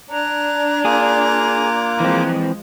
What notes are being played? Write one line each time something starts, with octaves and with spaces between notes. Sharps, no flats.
D4 A#5 F#6 G#6
A#3 F4 G#4 D6
E3 F3 G#3 C4